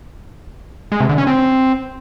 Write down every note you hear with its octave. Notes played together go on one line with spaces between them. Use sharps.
G#3
C3
D3
C#4
C4